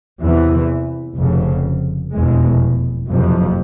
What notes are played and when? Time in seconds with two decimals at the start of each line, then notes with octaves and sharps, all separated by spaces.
0.21 E2 C3 E3
1.17 F1 F2 C#3
2.13 F1 E2 B2 G#3
3.10 F#1 F2 C3 F3